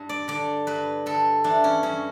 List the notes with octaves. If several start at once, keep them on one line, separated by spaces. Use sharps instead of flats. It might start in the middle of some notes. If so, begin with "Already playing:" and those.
Already playing: G2
D5
D3 D5
G2 B4
D3 A4
E3 D4
C#4
G2 C#4